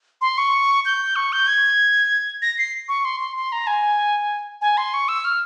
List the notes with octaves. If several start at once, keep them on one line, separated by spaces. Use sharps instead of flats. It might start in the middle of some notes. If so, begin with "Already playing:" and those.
C6
C#6
G6
C#6
G6
G#6
A#6
C7
C#6
C6
C6
C6
A#5
G#5
G#5
C6
C#6
E6
F6